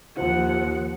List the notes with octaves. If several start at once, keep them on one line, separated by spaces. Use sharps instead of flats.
D#2 F3 F4 C5 F#5